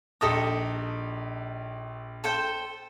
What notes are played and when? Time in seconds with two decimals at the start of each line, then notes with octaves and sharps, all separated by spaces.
0.21 A#1 D#4 G4 A4 D#6 A#6
2.24 A4 C5 G5